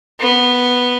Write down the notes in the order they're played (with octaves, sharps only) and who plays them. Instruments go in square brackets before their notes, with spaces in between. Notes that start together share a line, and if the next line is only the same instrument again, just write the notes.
[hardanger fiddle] B3